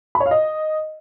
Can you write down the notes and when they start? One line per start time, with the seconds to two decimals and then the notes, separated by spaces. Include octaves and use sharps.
0.15 B5
0.20 C#5
0.26 F5
0.31 D#5